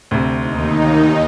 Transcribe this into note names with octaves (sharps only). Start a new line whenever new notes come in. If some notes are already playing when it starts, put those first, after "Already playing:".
D2 C3
D#2 D#4